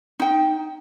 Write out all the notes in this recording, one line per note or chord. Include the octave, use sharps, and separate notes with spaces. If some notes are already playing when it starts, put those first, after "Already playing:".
D#4 G5